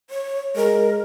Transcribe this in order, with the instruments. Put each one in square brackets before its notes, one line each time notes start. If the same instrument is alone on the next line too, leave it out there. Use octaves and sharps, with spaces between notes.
[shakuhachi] C#5
[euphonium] G#3 [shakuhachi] A#4